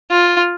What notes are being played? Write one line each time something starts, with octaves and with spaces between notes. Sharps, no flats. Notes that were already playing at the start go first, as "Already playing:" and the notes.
F4